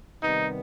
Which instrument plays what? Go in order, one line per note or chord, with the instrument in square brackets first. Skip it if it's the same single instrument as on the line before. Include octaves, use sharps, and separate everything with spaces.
[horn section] C3 D#3 G3 B3 D#4